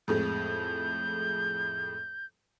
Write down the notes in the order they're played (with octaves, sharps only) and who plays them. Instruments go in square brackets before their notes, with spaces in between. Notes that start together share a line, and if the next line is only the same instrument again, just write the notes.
[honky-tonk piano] F2 A2 G#3 [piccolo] G6